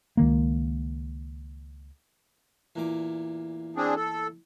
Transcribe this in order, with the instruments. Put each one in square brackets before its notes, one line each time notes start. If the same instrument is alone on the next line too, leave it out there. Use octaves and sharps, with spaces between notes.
[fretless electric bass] C#2 D#3 A#3
[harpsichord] E2 A#2 D6
[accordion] C4 D4 G#4
A4